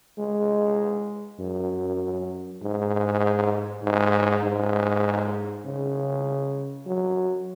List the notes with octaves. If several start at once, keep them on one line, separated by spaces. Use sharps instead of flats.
G#3
F#2
G#2
G#2
G#2
C#3
F#3